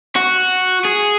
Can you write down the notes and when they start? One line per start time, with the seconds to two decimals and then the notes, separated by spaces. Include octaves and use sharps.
0.16 F#4
0.85 G#4